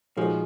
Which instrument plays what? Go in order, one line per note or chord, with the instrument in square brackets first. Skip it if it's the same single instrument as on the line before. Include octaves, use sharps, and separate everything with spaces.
[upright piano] A#2 G#3 D#4 F#4 [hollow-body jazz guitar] F3